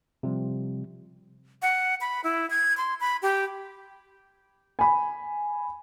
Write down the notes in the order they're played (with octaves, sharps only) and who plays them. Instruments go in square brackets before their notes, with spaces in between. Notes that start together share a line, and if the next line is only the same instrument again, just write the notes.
[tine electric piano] C3 F3 G3
[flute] F#5
B5
E4
G#6
C6
B5
G4
[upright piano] G#5 B5